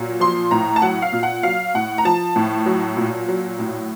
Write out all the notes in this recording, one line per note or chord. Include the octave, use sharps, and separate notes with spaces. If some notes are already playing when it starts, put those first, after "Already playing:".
Already playing: A#2 F#3
F3 C6
A2 A#5
A5
F#3 F#5
F5
A#2
F#5
F#3 F5
A2 F#5
A#5
F3 A5
A2
F#3
A#2
F#3
A2